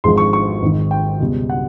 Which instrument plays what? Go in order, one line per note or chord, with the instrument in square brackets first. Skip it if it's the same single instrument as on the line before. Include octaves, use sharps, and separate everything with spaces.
[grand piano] G#1 G#2 F3 G#3 C6
C#6
C#6
G#1 G#2 D#3 G#3
G5
C#2 B2 G3
F#5